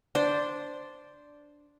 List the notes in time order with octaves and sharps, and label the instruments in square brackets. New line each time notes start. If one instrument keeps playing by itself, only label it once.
[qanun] D4 C5